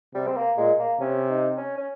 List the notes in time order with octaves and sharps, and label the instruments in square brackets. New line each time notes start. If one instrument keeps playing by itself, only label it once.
[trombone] C3 [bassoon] G3
[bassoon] C4
A#3
[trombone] A#2 [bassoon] G#3
[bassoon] A#3
[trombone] C3 [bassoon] C#4
[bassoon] D#4
C#4
C#4